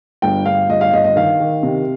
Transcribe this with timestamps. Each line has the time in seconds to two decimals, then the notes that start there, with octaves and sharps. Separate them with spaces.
0.22 G1 G5
0.46 G1 F5
0.70 G1 D#5
0.81 F5
0.93 G1 D#5
1.04 D#5
1.16 D#3 F5
1.40 D#3
1.63 C3